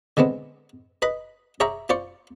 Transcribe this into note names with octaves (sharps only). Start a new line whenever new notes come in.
D3 G#3 B3 C4
B4 D#5 B5
G#4 C#5 E5 G5 A#5 D6
F4 C5 D5 C#6